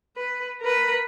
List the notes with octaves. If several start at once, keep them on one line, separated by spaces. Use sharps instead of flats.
B4
A#4 B4